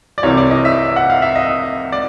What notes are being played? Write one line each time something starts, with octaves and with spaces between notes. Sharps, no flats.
D5
C2 C3 E3 C#5
D5
D#5
E5
F#5
F5
E5
D#5
D5